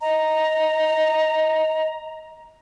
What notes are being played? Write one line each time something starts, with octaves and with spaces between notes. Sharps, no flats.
D#5 A#5